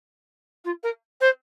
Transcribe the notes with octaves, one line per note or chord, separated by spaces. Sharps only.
F4
A#4
C5